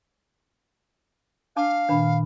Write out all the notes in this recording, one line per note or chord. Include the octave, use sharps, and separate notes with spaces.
D4 F5 A5 D6
A#2 D#3 D4 B4 B5